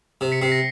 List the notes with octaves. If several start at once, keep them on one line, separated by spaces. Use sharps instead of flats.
C3
B6 C#7
C3 C7
A#6